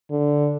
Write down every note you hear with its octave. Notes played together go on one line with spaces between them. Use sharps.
D3